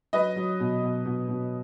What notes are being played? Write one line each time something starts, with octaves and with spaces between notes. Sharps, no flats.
F#3 B4 D#5
F#3
B2
B2
B2
B2